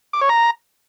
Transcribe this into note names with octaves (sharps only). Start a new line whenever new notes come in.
D6
C#5
A#5